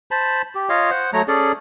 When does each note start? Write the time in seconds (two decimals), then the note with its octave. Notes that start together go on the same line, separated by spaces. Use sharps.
0.11 C5 A5 B5
0.55 G4
0.69 F4 C#5 D#5 F5
0.91 C5 F#5
1.13 F#3 A3 C#5 A#5
1.28 C#4 G#4 A4 D5